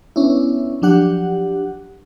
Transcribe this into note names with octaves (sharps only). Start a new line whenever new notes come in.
B3 C#4 D4 E4
F3 F#3 D4 G4 F#5